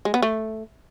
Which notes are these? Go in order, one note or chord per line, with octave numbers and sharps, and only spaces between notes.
G#3
B3
A3